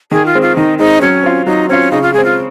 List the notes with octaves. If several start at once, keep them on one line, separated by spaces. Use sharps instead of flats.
D#3 G#4
F4
G#3 C4
F4
D#3 D#4
G#3 C4 D#4
F#3 C#4
C4 F4
F#3 D#4
C4 C#4 F4
C#3 D#4
F4
G#3 C4 G#4
F4